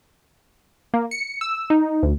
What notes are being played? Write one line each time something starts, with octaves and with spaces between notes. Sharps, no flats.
A#3
C#7
E6
D#4
D2